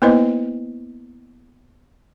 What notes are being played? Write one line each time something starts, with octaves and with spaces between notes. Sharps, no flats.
A#3 B3 E4 B4 C5 D#5